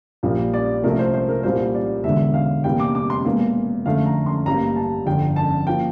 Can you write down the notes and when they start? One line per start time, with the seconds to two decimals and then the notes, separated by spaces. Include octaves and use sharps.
0.23 A#1 A#2 G3 A#3
0.54 D5
0.83 C2 C3 F3 A3 A#4
0.99 C5
1.14 C5
1.29 A#4
1.43 C2 A#2 G3 A#3 C5
1.74 D5
2.04 E1 E2 D3 E5
2.34 F5
2.64 E2 C3 G3 A#3 G5
2.80 D6
2.95 D6
3.10 C6
3.25 E1 E2 E3 A#3
3.86 F2 D3 A3 F5
4.06 A#5
4.26 C6
4.46 A1 G2 E3 G3 A#3 A#5
4.76 A5
5.06 G1 F2 D3 G5
5.36 A5
5.66 F3 A#3 G5